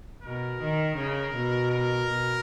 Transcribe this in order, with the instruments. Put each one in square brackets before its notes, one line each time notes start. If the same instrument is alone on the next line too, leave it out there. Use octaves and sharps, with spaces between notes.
[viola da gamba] B2 [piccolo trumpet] A#4
[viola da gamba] D#3
C#3
B2
[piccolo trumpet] A#4
[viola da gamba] B2